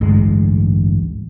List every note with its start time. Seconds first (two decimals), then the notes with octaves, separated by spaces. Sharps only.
0.01 A1 D2 G2 G#3